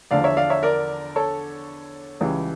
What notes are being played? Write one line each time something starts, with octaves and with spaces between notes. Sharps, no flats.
E2 D3 F3 D5 F5
C#5 E5
D5 F5
C#5 E5
A#4 D5
A4 C#5
C#2 C#3 E3 G3